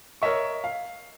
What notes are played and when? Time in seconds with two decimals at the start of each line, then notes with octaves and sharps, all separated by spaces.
0.22 A#4 C#5 D#5 E5 C#6
0.64 F5